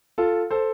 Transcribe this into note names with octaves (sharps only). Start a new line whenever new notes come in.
F4 A4
A4 C5